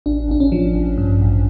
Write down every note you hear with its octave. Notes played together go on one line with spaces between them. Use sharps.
A1 D4
A1 D4
C#4
F3
A1
G2
A1